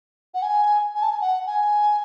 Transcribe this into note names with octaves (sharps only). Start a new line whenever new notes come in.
F#5
G#5
G#5
A5
G#5
F#5
G#5